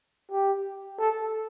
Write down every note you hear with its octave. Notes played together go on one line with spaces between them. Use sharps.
G4
A4